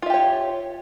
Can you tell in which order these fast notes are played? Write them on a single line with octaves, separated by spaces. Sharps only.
F4 E5 G4 C#5